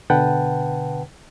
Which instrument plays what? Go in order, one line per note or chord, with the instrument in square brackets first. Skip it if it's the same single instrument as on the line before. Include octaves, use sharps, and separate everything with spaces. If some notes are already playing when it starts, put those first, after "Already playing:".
[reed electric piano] B2 D3 B4 F#5 G5 A5